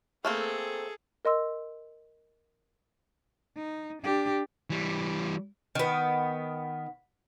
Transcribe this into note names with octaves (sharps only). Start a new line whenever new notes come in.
A3 A#3 C4 G#4 A4
A#4 D#5 C6 E6
D#4
D4 G4
E3 G3
D#3 B3